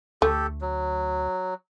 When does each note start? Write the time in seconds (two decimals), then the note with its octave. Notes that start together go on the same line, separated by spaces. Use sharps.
0.22 D2 A3 G4 A4
0.61 F#3